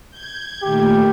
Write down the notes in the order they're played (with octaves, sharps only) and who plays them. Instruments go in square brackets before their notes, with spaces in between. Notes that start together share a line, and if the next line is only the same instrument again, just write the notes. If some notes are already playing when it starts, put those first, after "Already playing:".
[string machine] G6 G#6
[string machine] A#2 D#3 A3 [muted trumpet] G4